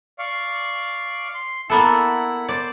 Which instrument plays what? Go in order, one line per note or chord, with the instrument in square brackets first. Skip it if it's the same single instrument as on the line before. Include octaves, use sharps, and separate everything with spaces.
[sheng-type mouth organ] D5 F5 C#6
C6
[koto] A#3 B3 A4 [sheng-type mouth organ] E4 F#5
[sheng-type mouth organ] C5 [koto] D5